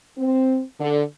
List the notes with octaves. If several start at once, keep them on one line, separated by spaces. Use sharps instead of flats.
C4
D3